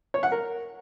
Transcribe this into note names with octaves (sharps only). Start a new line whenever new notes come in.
C#5
F#5
A#4